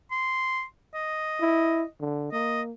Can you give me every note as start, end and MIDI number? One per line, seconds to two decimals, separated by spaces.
0.11 0.63 84
0.94 1.87 75
1.41 1.83 64
2.01 2.32 50
2.32 2.72 58
2.32 2.62 75